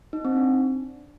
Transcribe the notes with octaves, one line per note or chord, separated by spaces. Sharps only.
D#4
C4
D4